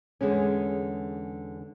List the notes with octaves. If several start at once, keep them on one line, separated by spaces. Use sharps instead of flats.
E2 D3 G#3 C#4